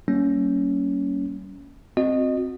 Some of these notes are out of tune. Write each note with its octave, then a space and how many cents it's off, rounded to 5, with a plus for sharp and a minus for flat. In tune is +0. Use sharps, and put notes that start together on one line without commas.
G3 -25 A#3 +0 C#4 +15
C4 +0 F#4 -30 D#5 -15